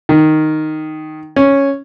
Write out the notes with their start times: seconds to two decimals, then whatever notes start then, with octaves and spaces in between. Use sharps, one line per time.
0.09 D#3
1.36 C#4